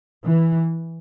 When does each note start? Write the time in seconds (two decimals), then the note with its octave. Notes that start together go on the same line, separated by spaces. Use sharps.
0.24 E3